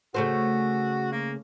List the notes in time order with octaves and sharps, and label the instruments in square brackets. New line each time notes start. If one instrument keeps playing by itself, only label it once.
[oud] C#3 A3 C5 [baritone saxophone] F#4
[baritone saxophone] A#3